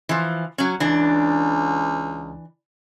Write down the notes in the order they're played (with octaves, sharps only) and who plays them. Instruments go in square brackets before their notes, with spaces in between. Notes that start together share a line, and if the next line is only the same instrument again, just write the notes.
[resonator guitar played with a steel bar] E3 F3
F#3 C#4
[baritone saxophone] C#2 [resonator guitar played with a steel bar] E3 D4